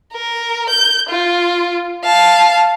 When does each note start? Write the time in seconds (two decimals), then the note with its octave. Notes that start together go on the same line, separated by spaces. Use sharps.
0.13 A#4
0.70 G6
1.09 F4
2.04 F5 A5